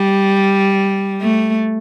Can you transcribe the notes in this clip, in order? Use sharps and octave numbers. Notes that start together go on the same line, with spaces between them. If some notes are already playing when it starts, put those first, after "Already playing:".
Already playing: G3
A3